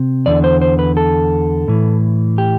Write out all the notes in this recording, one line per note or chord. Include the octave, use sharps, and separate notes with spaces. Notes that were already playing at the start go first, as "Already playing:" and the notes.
Already playing: C3
E2 D3 D5
C5
C5
B4
A4
A2 E3
G4